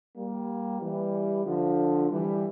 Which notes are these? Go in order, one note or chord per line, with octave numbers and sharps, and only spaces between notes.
G3 A#3
E3 G3
D3 F3
E3 G3